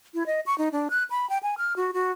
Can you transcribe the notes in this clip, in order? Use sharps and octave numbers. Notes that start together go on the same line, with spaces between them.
E4
D#5
C#6
D#4
D4
F#6
B5
G5
G#5
F6
F#4
F#4